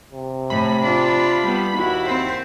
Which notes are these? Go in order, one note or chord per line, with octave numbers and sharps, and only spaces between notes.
C3
A2 B5
D4 F4
G3 B3
D#2 E4 F#4
C4 C5